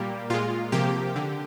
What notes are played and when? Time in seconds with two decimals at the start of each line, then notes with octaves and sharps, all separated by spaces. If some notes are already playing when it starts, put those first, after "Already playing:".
Already playing: A#2 G3 A#3 G4
0.30 A#2 G#3 F4
0.72 C3 F3 A#3 G4
1.16 D3